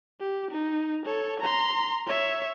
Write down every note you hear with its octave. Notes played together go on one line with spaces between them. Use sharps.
G4
D#4
A4 C#5
A#5 C6
C#5 E5